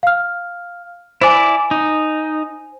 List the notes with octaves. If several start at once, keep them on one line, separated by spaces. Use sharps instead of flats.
F5 F6
E4 C5 D5 G#5
D#4